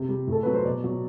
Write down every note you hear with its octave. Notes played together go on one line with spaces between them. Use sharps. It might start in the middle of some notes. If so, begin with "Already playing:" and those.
Already playing: C3
G3
A2 A4
F#3 B4
C5
B2 D5
F#3